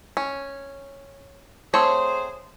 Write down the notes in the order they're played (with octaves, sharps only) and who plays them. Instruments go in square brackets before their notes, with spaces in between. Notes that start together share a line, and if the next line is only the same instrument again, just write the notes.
[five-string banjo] C#4
[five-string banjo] A3 C4 C#5 [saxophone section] G#4 C5